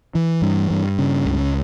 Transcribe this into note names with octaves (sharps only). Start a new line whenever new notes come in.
E3
G2
G2
C#3
C#2